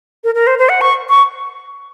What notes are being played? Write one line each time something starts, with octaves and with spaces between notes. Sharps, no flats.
A#4
A#4
C5
C5
F#5
C#6
C#6